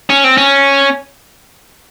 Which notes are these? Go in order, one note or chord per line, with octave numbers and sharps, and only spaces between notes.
C#4
C4
C#4